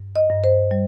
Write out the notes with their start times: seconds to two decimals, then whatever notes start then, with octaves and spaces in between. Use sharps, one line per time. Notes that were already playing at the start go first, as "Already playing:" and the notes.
Already playing: G2
0.16 D#5
0.29 G2
0.44 C5
0.71 G3